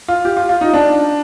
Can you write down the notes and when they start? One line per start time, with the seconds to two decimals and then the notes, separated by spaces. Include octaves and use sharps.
0.08 F4
0.25 G4
0.37 F4
0.49 F4
0.61 D#4
0.74 D4